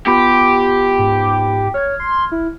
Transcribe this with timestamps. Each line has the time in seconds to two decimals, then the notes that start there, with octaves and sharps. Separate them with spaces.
0.07 B3 F4 G4 B5
0.99 G#2
1.74 C#5 F6 G#6
2.00 C6
2.32 E4